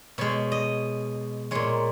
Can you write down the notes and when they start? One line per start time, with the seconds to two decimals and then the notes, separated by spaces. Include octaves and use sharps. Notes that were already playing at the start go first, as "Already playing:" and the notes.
0.18 B2 G#3 C#5
0.52 D#5
1.51 A#2 G#3 C#5